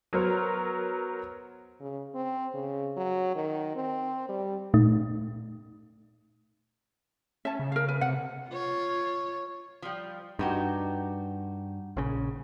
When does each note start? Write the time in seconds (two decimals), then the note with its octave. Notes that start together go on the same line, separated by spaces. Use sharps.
0.13 F#3 B3 F#4 A#4 C5 C#5
1.81 C#3
2.15 C4
2.54 C#3
2.97 F#3
3.35 D#3
3.76 C4
4.29 G3
4.74 A#2 A3 D#4
7.45 C#4 E5 A5
7.59 C#3
7.72 A#4 F5
7.89 B4
8.01 C3 F#5
8.48 F4 C#5
9.82 F3 G3
10.39 G2 D#4 F#4 G4
11.97 A#1 C#3